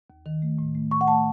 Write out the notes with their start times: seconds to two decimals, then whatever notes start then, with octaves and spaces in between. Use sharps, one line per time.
0.10 D#2
0.26 D#3
0.42 A3
0.59 A2
0.75 A3
0.91 A2 C#6
1.01 F#5
1.07 A3 A5